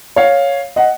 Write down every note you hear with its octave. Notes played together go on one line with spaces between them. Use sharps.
C#5 F5
D#5 F#5